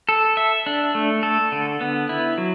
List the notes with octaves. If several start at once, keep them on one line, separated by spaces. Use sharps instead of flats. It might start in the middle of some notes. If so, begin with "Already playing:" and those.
A4
E5
D4
A3
A4
D3
B3
E4
F#3